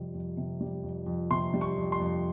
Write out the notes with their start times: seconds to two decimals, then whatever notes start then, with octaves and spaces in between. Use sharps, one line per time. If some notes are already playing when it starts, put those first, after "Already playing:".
Already playing: F2 C3 G3
0.14 F2
0.37 C3
0.61 G3
0.83 F2
1.06 F2
1.31 C3 C6
1.54 G3
1.61 C#6
1.77 F2
1.92 C6
2.00 F2